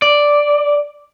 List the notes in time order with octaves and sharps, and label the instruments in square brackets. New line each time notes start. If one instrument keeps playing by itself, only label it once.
[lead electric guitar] D5